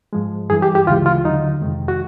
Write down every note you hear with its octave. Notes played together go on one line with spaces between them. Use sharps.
G#2 F3 G#3
G2 E3 G3 G#4
G4
G4
D2 C#3 E3 G#3 F4
F4
D#2 D3 F#3 D#4
F2 C3 D#3 G#3
F#4